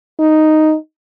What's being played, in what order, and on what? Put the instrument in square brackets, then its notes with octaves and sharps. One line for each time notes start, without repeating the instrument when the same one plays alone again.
[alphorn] D#4